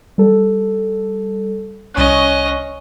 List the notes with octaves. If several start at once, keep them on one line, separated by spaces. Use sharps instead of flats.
G3 A4
C2 C#4 D#5 C#6 F#6